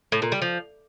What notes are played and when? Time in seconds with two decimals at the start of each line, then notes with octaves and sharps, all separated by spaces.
0.12 A2
0.22 A#2
0.32 G3
0.42 F3